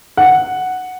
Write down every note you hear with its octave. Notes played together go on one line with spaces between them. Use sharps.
F#5